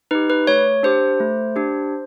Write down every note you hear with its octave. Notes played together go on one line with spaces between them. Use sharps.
D#4 G4 B4
B4
A3 C#5
D4 G4 C5
A3
D4 G4